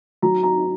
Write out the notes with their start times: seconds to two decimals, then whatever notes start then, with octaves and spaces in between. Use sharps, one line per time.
0.22 F#3 A#5
0.43 A#5